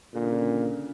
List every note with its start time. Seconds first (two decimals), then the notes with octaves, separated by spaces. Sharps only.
0.14 A#2 D3
0.24 C#3
0.33 D3